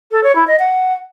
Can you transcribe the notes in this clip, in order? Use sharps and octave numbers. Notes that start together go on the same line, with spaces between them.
A4
C#5
E4
D#5
F#5